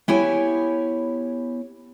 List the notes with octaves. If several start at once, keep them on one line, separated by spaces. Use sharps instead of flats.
B3 E4 G4 C#5 G#5